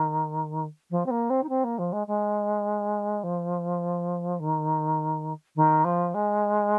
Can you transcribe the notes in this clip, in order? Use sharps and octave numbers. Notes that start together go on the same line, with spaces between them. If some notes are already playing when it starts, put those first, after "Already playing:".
Already playing: D#3
F3
C4
A#3
C4
D#4
C4
A#3
F3
G#3
G#3
F3
D#3
D#3
F3
G#3